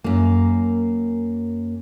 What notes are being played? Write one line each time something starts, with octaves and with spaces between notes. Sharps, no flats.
F#2 A#3